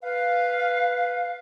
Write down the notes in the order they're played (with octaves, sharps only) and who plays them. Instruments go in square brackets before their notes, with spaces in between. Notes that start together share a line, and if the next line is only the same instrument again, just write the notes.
[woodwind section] B4 F5